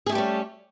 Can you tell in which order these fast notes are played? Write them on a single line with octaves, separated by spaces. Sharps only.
G#4 A3 G4 G3 C#4